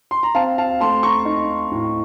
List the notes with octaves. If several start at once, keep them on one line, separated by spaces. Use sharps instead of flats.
C6
A#5
C4 F5 A5
F5 A5
A3 A5 C6
A#5 C#6
D#4
A2